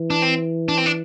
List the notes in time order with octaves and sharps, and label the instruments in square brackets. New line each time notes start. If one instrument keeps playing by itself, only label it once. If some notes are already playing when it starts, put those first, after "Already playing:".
Already playing: [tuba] E3
[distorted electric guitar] D4
C4
D4
C4
D4